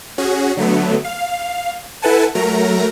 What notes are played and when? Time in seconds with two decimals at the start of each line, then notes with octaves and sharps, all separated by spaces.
0.18 C#4 F#4 G#4
0.57 D3 F#3 A3 B3
1.04 F5
2.02 E4 A4 B4 F#5 G#5 A5
2.35 F#3 A3 A#4 A#5